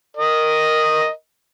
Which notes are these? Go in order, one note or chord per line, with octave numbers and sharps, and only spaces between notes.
A#4 D#5